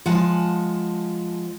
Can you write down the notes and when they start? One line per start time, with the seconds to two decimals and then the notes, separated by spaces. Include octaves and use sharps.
0.06 F3 G#3 F#5 G#5 A5